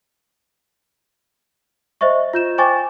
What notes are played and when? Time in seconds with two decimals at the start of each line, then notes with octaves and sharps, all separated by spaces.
2.01 C5 D#5 E5 C#6
2.33 F4 G6 E7
2.58 C5 G5 G#5 C#6 D6 A6